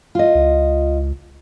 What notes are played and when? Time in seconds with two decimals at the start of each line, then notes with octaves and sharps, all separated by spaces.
0.15 F4 D#5
0.35 C#2